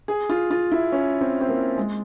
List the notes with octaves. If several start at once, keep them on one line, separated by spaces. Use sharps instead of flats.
G#4
F4
F4
E4
C#4
C4
C4
A#3
G#3